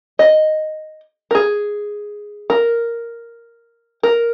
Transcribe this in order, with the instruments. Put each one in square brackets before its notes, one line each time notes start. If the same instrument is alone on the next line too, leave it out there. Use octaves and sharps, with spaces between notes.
[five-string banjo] D#5
A#4
G#4
A#4
A#4